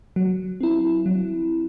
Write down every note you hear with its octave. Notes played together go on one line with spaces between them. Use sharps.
F#3
C4 E4
F#3